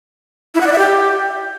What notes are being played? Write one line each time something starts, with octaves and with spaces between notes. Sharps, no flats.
E4
F#5
D5
E5
G4